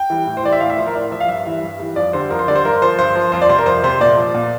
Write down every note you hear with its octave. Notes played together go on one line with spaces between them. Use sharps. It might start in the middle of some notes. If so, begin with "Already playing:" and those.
Already playing: G5
E3 G3
A2
C5
E3 G3 D5
E5
A2 F5
E5
F3 C5
A#4
A2 D5
F3 E5
F5
G2 E5
E3 G3
G2
E3 G3
F2 D5
D3 G3 C5
F2 A#4
C5
D3 G3 D5
C5
G2 A#4
F3 C5
G2 C5
F3
F2 C5
D5
C3 G3 C5
A#4
F2 C5
C3 G3 C5
A#2 D5
F3
A#2